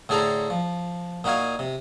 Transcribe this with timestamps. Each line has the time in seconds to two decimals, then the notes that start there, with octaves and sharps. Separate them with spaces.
0.09 A2 D3 G#4 A4 C5 A#5
0.50 F3
1.24 A#2 D#4 F#4 F5 G#5
1.59 C3